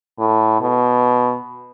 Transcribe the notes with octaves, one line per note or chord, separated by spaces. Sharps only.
A2
B2